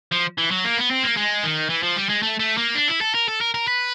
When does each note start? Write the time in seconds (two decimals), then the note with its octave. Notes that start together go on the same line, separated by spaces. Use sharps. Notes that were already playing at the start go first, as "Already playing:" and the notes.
0.12 F3
0.38 E3
0.51 F#3
0.64 A#3
0.77 B3
0.91 C4
1.04 A#3
1.17 G#3
1.44 D#3
1.70 E3
1.83 F3
1.96 G3
2.09 G#3
2.23 A3
2.40 A3
2.58 A#3
2.75 D4
2.88 E4
3.01 A4
3.15 A#4
3.28 A4
3.41 A#4
3.54 A#4
3.68 B4